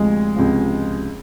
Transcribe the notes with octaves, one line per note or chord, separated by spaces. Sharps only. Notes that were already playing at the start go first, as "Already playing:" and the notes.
Already playing: D2 C3 F3 G#3
C#2 C3 F3